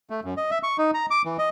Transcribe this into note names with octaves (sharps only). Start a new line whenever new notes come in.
A3
F#2
D#5
E5
C#6
D#4
A#5
D6
E3
D#5